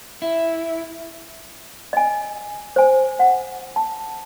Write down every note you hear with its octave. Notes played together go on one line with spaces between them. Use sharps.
E4
D#5 G#5
C5 G#5
F#5
A5